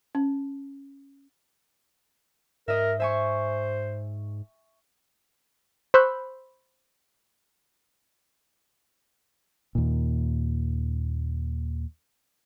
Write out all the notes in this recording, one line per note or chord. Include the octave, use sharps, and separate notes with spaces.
C#4
G#2 A#4 D#5 E5
C5 E5 G#5 C#6
C5 B5 C#6 E6 F#6 G6
D#2 A#2